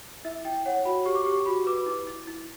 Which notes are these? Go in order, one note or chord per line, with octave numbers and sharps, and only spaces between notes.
E4 E5
E4 G5
C#5 F#5
F#4 B5
G4 C#6
D6
G4 C#6
F#4 B5
B4 D6
E4
E4
E4